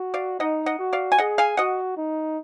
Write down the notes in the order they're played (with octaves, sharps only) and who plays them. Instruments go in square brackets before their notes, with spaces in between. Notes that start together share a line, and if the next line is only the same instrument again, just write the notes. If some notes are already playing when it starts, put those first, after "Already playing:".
Already playing: [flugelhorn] F#4
[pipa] D5 F5
[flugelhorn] D#4 [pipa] D#5 F#5
[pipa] D#5 F#5
[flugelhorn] F#4
[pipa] D5 F5
G#5
[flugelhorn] G#4 [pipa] D#5 F#5
[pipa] F5 G#5
[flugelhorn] F#4 [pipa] D#5 F#5
[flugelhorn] D#4